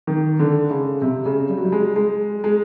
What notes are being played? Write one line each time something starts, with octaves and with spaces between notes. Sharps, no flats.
D#3
D3
C#3
C3
C#3
G3
F#3
G3
G#3
G#3
G#3